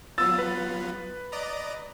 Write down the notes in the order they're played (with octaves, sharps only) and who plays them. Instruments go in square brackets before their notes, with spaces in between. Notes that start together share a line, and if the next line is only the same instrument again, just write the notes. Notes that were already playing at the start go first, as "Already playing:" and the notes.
[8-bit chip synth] F#3 B3 F4 [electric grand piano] E6 A6
[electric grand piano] B4
[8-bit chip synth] D5 D#5 A#5